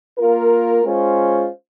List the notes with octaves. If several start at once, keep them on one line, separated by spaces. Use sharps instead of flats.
A#3 F4 A#4
G#3 C#4 F4 C5